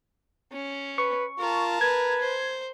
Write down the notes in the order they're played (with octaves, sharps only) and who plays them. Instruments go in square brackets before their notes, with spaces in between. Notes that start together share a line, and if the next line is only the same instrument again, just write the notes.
[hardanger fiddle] C#4
[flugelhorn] B4 [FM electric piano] C#6
[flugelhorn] F4 [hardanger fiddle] A#4 A5
[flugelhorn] B4 [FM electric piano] G#6
[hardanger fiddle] C5